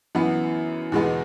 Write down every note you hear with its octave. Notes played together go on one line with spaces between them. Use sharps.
F#2 E3 B3
E2 B2 G#3 B3